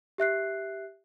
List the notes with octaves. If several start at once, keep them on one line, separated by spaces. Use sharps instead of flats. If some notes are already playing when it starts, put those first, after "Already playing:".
G4 E5 F#6 C7